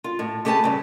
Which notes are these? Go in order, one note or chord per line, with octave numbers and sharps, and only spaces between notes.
F4
A2
A3 G4 G#4 B4 A5
G2 C#3